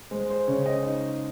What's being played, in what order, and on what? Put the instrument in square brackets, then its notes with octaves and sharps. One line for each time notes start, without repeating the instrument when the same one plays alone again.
[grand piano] G#3 C5
C5
C#3 C#5
D#5
D#4